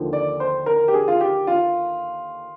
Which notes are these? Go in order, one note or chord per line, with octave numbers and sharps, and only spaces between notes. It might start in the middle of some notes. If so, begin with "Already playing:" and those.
Already playing: D#2 D3 F3
D5
C5
A#4
G4
G#4
F4
G4
F4